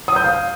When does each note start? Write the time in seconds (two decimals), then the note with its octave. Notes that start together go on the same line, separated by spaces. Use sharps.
0.08 D#6
0.16 G6
0.24 F5